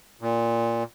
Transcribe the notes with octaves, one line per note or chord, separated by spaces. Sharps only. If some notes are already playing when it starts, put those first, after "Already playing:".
A#2